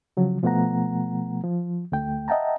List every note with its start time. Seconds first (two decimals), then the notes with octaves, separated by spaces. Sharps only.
0.17 C#3 F3 F#3
0.43 B2 F3 A3 B3 F#5 A#5
1.43 F3
1.92 D2 A3 G5
2.28 D#5 E5 F#5 G5 A5 A#5